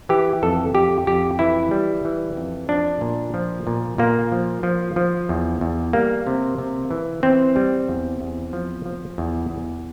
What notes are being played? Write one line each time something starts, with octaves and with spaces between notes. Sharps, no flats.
E3 G4
F2 A4
F2 G4
F2 G4
E3 E4
G3
E3
F2
F3 D4
A#2
F3
A#2
A#2 A#3
F3
F3
F3
E2
E2
G3 A#3
C3
C3
E3
E3 C4
G3
E2
E2
F3
F3
E2
E2